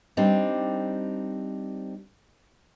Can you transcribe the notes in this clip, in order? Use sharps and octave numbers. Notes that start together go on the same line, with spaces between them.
G3 C4 D4 D#4